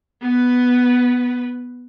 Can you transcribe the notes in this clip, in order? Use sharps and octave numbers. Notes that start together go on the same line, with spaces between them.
B3 B4